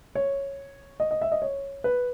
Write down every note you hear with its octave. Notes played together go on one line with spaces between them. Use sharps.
C#5
D#5
D#5
E5
D#5
C#5
B4